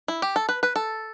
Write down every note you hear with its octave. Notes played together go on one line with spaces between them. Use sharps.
E4
G4
A4
B4
B4
A4